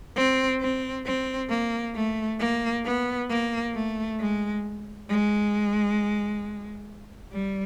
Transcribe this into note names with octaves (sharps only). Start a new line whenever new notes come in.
C4
C4
C4
A#3
A3
A#3
B3
A#3
A3
G#3
G#3
G3